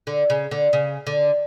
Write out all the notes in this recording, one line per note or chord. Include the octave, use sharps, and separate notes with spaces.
D3
C#3
D3
C#3
D3